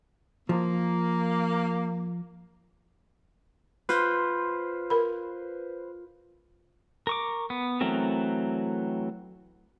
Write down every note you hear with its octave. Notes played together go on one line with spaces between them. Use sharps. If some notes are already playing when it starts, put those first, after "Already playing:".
F3 A#3
F4 B4 C5
A#4 B5
A#4 C#6 D6
B3
E3 F#3 A3 C4 A#4